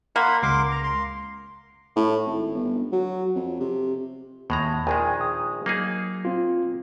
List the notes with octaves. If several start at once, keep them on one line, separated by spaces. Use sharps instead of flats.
A#3 F#5 B5 C6
C#2 A#4 C6 D6 C7
A#5
C6
A2
G#1
G1
F#3
F2
C3
D#2 A2 G#3 A#5
A#1 D#3 G#3 G5 G#5 A#5
D#6
F#3 A#3 D#4 G#4
C4 F4